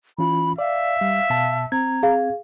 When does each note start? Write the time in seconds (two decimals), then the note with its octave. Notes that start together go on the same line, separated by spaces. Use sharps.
0.18 E3 C#4 F4 B5
0.59 D5 E5 F5
1.01 G3
1.30 B2 A5
1.72 C4 A#5 G#6
2.03 G#4 F5